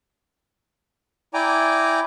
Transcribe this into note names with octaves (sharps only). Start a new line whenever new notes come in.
E4 D5 G5 G#5 A#5 D6